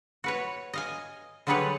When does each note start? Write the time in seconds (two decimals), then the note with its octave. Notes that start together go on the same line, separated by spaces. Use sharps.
0.24 F#4 B4 C#5
0.74 D#5 F5 G#5
1.47 D3 F#3 G3 G#4 B4 C#5